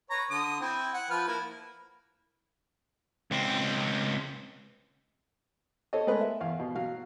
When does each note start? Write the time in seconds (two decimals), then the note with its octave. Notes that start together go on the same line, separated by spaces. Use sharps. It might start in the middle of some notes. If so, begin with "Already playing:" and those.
0.10 B4 C#5 A#5
0.30 D3 D#6
0.60 C4 E4
0.94 F#5
1.10 F3 B4 F6
1.28 A#3 E4
3.31 C#2 C4
5.93 A4 C5 C#5 D#5
6.07 G#3 A3 A#4 B4 D#5
6.21 E5
6.41 E2 F5
6.59 B2
6.75 F#3 F5